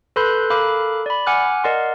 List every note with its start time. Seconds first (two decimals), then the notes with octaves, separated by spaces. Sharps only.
0.16 A4 B4 B5 C6 F#6 G6
0.50 A4 A#4 F5 B5 D6 F#6
1.06 D5 B5
1.27 F#5 G#5 D6 F6 F#6
1.64 A#4 D5 D#5 F#5 C6